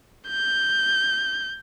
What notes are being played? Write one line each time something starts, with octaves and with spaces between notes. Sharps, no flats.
G6